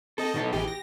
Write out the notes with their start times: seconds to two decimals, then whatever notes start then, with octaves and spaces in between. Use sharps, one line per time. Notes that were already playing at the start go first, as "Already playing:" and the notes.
0.18 C4 A4 D#5
0.34 B2 D#4 A4
0.53 A1 E3 G4 G#4
0.68 A#6